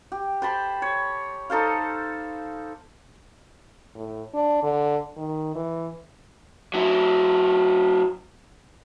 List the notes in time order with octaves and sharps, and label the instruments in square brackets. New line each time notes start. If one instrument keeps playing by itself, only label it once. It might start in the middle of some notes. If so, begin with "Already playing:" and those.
[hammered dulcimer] G4
C5 A5 B5
C#5
D#4 A4 C5 F5
[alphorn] A2
D4
D3
D#3
E3
[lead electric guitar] F#3 E4